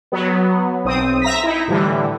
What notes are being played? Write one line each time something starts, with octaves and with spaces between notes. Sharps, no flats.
F#3 B3
B1 C4 D#6
E5 A#5 A#6 B6
D#4 E4
A2 D3 E3 G3